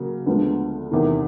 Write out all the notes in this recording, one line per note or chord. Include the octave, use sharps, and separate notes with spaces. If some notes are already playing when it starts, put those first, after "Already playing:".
Already playing: C#3 F#3 A#3
D2 D3 F3 G#3 B3
E2 C3 D#3